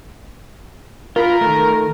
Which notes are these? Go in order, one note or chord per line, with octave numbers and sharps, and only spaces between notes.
F4 A#4 B5
D#3 A3